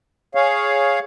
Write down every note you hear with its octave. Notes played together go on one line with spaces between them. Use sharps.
G#4 C#5 F5